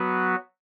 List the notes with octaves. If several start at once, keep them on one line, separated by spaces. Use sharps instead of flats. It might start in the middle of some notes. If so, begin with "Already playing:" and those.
Already playing: F#3 B3 F#4 B4